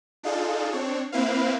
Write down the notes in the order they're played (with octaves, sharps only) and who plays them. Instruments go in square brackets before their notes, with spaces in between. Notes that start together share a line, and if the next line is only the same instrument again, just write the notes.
[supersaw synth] D4 D#4 F4 G#4 A4
C4 D4 C#5
A#3 C4 E4 B4 F5